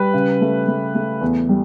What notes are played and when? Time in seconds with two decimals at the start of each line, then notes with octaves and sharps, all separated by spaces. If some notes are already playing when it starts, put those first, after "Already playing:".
Already playing: G3 B4
0.14 C#3
0.41 A3
0.68 A3
0.95 A3
1.21 E2
1.49 G3